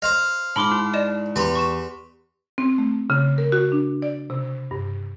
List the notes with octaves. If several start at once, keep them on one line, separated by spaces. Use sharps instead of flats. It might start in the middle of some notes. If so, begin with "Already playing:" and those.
C5 D#5 F5
G#2 A5 B5 C6 D6 F6
E4
D5 D#5 E7
E2 G4 B4 C6
C#6 E7
C4
A3
C#3
A#4
F#4
D4
D5
C3
G2